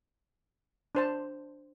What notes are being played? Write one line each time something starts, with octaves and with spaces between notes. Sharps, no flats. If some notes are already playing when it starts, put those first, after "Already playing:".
D4 C5 A5